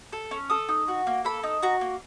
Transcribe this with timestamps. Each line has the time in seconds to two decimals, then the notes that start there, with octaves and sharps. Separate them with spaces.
0.13 A4
0.31 C#4
0.50 A4 D#6
0.69 D#4
0.88 F#4
1.07 A#3
1.25 A4 B5
1.43 D#4
1.62 F#4 A#5
1.81 A#3